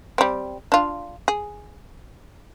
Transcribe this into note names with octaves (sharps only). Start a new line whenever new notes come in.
G3 C4
D4 F4
G#4